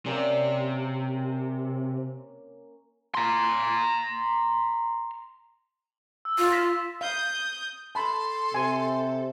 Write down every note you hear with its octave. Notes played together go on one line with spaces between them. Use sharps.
C3 A#3 C#4 D5
A#5 C6
E6
F4
A#6 B6 E7
F5 D#6 G6
A4 A5 B5 C6
C3 G#5